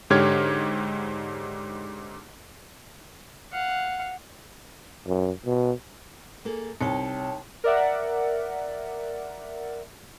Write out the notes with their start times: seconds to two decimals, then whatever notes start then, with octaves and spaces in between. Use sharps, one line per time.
0.10 G#2 D3 G4 C#5 F6 G#6
3.52 F5 F#5
5.07 F#2
5.46 B2
6.45 A#3 G#4 A4
6.81 C2 D#4 C#5 G5 A5
7.64 A#4 D5 E5 F#5